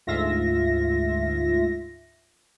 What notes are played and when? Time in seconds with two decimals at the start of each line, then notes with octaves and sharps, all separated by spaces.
0.07 D2 G#2 F4 E5 A#6